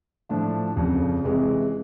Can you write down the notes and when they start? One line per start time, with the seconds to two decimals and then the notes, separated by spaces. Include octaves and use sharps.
0.29 A2 F3 A3 D4 F4
0.76 F1 F2 C#3
1.24 C3 E3 G#3